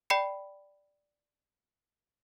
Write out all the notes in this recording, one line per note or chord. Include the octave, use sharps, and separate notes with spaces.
D5 G5 B5 C7 C#7